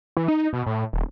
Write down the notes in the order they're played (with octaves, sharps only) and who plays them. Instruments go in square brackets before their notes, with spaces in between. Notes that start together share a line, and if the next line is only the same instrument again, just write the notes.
[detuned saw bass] E3
D#4
B2
A2
D#1